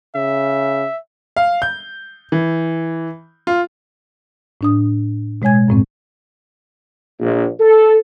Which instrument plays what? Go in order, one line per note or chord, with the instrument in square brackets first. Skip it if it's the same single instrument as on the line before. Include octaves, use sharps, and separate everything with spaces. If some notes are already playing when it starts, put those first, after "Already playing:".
[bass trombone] C#3 [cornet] E5
[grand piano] F5
G6
E3
F4
[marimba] A2 D4 D#6
B2 G#3 C#5 G#5 G#6
F#2 A2 C4
[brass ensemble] A#1
A4